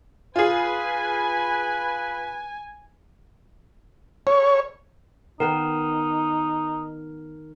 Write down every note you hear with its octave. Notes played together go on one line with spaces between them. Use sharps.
F4 G#4 B4 G#5
C#5
D#3 B3 D#4 A#4 B4